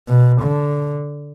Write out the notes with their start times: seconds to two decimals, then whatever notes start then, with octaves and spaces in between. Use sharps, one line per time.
0.08 B2
0.42 D3